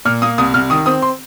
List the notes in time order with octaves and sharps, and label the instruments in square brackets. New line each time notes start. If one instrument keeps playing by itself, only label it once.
[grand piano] A#2 F6
A#3 D#6
C2 D#6
C2 F6
D#3 D#6
C4 D#6
C6